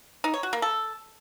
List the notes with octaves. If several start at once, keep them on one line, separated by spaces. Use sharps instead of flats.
D#4
C#5
F#4
A#3
A4